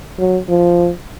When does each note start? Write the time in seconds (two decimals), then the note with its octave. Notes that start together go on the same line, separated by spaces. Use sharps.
0.19 F#3
0.49 F3